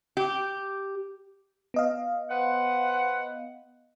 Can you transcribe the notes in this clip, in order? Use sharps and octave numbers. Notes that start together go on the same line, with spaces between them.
G4
B3 D#5 F5
B4 C5 F#5